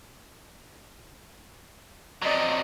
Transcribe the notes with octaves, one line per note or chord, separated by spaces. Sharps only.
F2 F#3 D5 D#5